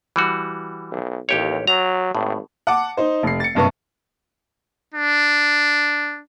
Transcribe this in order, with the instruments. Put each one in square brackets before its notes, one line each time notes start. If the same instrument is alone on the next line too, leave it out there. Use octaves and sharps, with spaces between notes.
[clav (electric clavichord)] E3 G3 F#4
[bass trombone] B1
[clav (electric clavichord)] A1 G4 C#5 [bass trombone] D#2
[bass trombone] F#3 [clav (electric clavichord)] A#5
[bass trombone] G#1 [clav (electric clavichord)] A2
[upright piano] F#5 A5 D6
D#4 C5
F1 C7
A6 C#7
F#1 G2 C3 B4 C#6
[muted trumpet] D4